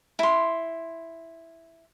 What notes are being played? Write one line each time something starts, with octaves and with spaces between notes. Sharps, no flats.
E4 C6